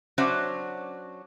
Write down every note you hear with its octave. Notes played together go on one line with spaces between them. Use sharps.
F#3 C#4 D4 F#4 C5 E5